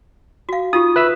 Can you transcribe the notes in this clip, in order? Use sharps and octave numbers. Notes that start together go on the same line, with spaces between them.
F#4 F5
D#4 F4 G4 D#6
B4 E5 E6